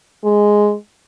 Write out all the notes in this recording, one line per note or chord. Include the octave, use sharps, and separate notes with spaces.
G#3